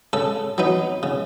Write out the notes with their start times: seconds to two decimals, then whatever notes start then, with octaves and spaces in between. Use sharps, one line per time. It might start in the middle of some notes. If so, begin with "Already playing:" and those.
0.13 C#3 A4
0.58 F#3 B3 D#4
1.03 C#3